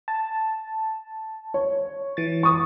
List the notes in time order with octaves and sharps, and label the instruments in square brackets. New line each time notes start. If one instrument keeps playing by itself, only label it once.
[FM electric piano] A5
[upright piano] C#5
[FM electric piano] E3 A6
[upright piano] C#6 D#6